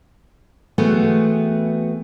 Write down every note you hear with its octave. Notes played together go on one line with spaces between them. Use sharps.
E3 A3 B3 C4 F#4 G#4